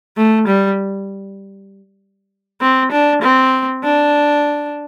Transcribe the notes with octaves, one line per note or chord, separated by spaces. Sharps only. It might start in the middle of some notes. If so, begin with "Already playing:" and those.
A3
G3
C4
D4
C4
D4